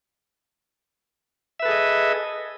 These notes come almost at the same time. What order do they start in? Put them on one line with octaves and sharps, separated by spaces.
E5 B4 A4 G#4 D#5